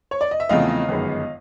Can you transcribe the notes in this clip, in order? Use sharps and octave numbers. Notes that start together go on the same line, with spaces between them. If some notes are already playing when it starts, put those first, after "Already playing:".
C#5
D5
D#5
E5
E2 C#3 F3 A3 C4 D#5 F5
G1 F#2 D#3 G#3 B3